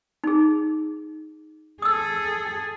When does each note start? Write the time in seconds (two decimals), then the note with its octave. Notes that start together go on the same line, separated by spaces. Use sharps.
0.24 D#4 G#4
1.82 G#4 A4 D#6 E6